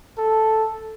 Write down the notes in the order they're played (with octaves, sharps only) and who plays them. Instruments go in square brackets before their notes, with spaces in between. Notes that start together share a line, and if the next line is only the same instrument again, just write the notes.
[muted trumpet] A4